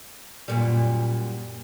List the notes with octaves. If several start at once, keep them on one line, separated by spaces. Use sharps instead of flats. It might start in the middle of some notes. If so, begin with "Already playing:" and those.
F#2 A#2 G3